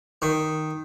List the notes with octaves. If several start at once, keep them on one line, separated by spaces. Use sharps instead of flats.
D#3